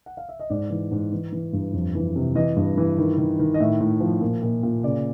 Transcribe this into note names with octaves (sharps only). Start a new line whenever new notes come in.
F#5
F5
E5
D#5
G#2 D5
E3
G#2
E3
E3
G2
F2
E3
C3
E3 D#5
G2
E3
D#3
D#3
D#3
D#5
A2 E5
A2
F3
A#2
A#2
A#2
C#3 D5